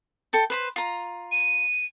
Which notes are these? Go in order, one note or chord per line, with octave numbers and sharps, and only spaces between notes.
A4 G5 A5
B4 C5 B5
F4 A#5
D#7